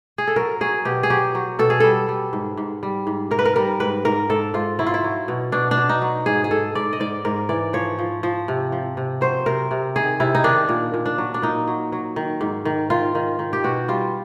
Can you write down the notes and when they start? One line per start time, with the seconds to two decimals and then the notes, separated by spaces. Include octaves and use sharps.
0.18 G#4
0.28 A4
0.36 F#3 A#4
0.61 F#3 G#4
0.85 B2 G4
1.03 G#4
1.10 F#3 G4
1.35 F#3
1.59 B2 A4
1.70 G#4
1.80 G3 A4
2.09 G3
2.33 G#2
2.57 G#2
2.83 G3
3.07 G#2
3.31 G#2 A#4
3.39 B4
3.45 A#4
3.56 G3 A#4
3.80 G#2 B4
4.05 G#2 A#4
4.30 G#2 A4
4.54 G#2 F4
4.79 F#3 E4
4.87 F4
4.94 E4
5.04 F#3
5.28 B2
5.52 B2 D4
5.71 D4
5.77 B2
5.89 D#4
6.02 F#3
6.26 G#2 G#4
6.44 G#4
6.51 G#2 A4
6.75 G#2 D5
6.93 D#5
7.00 G#2 D5
7.25 G#2 A#4
7.49 E3 D5
7.73 F3 C#5
7.99 F3
8.23 F3
8.48 C3
8.72 F3
8.97 C3
9.21 F#3 C5
9.46 C3 A#4
9.71 C3
9.96 D#3 G#4
10.20 C3 E4
10.35 D#4
10.44 D#3 D4
10.69 A#2
10.94 A#2
11.06 D4
11.18 F#3
11.34 D4
11.42 A#2 D#4
11.68 F#3
11.92 F#3
12.16 D#3
12.41 G#2
12.65 D#3
12.90 D#3 F4
13.15 D#3
13.39 D#3
13.53 G4
13.64 B2 F#4
13.88 G3 F4